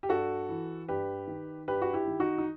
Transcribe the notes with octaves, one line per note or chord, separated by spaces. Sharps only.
G4
G2 F#4 A4
E3
G2 G4 B4
D#3
G2 G4 B4
F#4
E4 G4
D#3
D#4 F#4
D#4